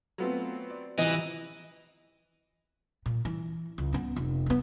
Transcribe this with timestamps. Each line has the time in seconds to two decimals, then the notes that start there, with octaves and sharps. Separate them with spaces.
0.18 F#3 A3 B3 C4 F4 F#4
0.70 D5
0.98 C2 E3 F3 D#5
3.06 A#2
3.25 E3
3.78 C#2
3.93 B3 C#4
4.16 F1
4.46 A3 B3